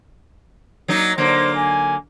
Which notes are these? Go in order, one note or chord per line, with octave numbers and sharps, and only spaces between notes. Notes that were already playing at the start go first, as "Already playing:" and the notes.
F#3 A#3 D#4
D3 F#3 A#3 C5
G#5